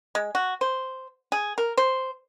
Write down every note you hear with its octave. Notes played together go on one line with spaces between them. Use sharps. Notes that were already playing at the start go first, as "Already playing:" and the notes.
G#3
F#4
C5
G#4
A#4
C5